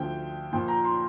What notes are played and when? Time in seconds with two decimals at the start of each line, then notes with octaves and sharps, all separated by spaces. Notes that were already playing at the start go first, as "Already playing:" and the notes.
Already playing: D2 D3 F3 G5
0.53 A#1 A#2 F3 G5
0.68 A#5
0.84 C6